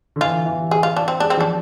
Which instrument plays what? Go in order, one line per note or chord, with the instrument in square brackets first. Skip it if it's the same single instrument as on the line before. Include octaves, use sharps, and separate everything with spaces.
[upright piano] D3
[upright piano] E3 [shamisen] F4
[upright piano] E3
[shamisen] G#4
F4
D4
C4
[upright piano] G#3 [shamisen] D4
[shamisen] C4
[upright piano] F3 [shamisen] D4